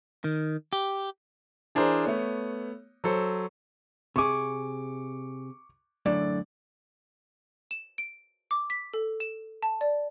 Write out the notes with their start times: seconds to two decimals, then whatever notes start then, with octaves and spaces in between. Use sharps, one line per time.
0.24 D#3
0.73 G4
1.75 E3 D4 G#4 A#4 C5
2.05 A3 B3 C#5
3.04 F#3 A4 C5
4.16 C3 G#4 C#6 D6
6.06 F#2 A2 D3 D5
7.71 E7
7.98 D7
8.51 D6
8.70 B6
8.94 A4
9.20 E7
9.63 A5
9.81 D5